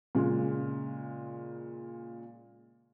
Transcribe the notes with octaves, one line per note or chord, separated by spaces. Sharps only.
A#2 C#3 G#3